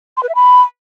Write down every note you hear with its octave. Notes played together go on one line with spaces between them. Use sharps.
C6
B4
E5
B5